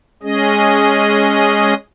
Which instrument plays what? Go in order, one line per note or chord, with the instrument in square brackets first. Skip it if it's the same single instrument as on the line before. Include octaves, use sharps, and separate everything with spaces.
[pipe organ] G#3 C#4 G#4 D#5